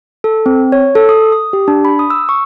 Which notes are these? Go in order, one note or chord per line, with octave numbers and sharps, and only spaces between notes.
A4
C4
C#5
A4
D#6
D#6
G4
D4
B5
D#6
E6
C#6